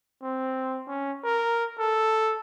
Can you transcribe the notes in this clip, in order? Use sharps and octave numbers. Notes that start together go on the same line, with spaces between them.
C4
C#4
A#4
A4